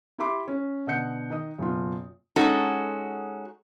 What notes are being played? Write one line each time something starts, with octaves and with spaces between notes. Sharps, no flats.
E4 G4 E5 B5 C6 D6
C#4
B2 D3 D#5 F#5 G6 C#7
D#3 D#5 D#6
F#1 B2 F4
G#3 C#4 D#4 F#4 A4